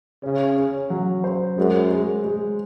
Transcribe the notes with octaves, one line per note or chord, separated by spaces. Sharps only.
C#3 C#4
C#4
F#3
C5
F#2 G#3
G#3
G#3